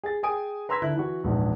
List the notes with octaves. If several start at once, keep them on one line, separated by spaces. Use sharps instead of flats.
G#4 A6
G#4 G5 G#5 D#6 D7
B4 A#5 C6 E6 G#6 B6
D3 E4 F#6
E3 F#4
A#1 E2 G#2